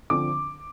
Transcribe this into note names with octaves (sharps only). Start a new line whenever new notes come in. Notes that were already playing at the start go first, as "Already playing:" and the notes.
D3 F3 C4 D6